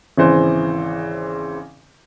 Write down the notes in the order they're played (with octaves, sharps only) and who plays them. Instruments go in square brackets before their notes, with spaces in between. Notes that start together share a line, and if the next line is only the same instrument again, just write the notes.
[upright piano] G#1 C#3 E3 C5